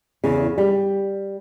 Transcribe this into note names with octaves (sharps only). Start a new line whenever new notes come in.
E2 C#3
G3